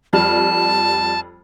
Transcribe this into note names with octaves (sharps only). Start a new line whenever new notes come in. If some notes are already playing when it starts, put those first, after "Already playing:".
F2 G3 A5 F6